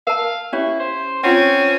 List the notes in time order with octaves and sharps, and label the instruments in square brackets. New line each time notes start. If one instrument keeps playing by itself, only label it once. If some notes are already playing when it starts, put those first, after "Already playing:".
[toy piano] A#4 A5 [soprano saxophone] F5
[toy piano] C#4 G4 C#5 [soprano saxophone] E4
[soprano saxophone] C5
[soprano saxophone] C4 [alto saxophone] C#4 [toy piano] F4 F#5